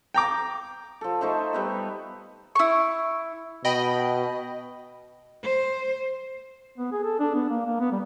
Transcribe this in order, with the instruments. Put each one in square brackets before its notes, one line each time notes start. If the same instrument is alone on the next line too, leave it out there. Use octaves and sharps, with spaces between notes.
[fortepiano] G5 A#5 D6
[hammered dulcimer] F3 A4
A3 D#4 C5 E5
G3 B3 E5
[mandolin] E4 C#6
[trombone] B2 [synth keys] D#5 G5 B5
[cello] C5
[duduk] B3
G#4
A4
D4
B3
A#3
A#3
B3
G3